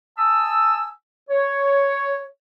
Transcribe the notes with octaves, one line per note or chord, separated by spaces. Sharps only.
G#5 A5 D#6 E6
C#5